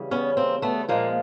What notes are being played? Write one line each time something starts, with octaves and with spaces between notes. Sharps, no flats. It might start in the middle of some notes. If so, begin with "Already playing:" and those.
Already playing: C#3 E3 G3
B3 C#4
A#3 C4
A3 B3
A#2 F3 G#3 A#3